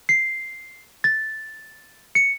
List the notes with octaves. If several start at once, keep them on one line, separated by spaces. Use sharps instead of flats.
C7
A6
C#7